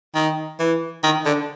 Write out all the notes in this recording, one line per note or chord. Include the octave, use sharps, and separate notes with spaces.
D#3
E3
D#3
D3